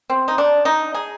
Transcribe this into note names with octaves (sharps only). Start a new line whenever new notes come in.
C4
D#4
D4
D#4
G#4